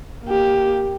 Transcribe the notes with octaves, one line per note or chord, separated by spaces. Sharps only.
A#3 G4